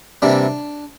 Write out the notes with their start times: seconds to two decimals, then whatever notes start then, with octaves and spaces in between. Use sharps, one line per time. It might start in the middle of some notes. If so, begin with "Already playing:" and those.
0.22 C3 E3 G3 A#3 D4